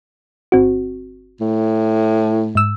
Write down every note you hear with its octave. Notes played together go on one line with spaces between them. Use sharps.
G1 C4 F#4
A2
G#2 E6